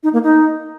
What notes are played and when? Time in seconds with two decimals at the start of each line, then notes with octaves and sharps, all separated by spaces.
0.03 D#4
0.13 A#3
0.23 D#4